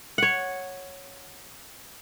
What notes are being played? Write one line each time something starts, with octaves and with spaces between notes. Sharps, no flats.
C#5 F#5